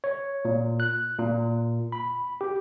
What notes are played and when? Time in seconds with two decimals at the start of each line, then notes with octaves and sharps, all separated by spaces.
0.04 C#5
0.45 A#2
0.80 F#6
1.19 A#2
1.92 B5
2.41 G4